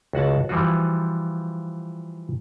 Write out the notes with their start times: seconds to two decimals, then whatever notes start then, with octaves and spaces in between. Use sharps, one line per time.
0.13 C#2 F#4 F#5 A5
0.49 E3 F3 G3 F4 F#4